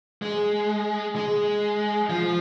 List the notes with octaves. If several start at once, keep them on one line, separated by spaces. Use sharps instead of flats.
G#3
G#3
F3